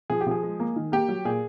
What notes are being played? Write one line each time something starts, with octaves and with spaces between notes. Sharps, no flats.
F3 G#4
G4
F3 G#4
G#3
A#3
D#3
A#3 G4
F#3
A#2 G#4